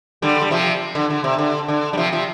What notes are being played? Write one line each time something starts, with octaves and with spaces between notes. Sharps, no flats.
D3 G3
G3
C3 F3
D3
D3
C3
D3
D3
G3
C3 F3
C3 F3